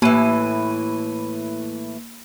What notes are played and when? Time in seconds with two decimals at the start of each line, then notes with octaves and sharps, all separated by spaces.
0.02 A2 E3 A#3 B5 D#7